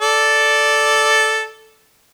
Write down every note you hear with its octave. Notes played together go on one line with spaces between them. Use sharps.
A4 D5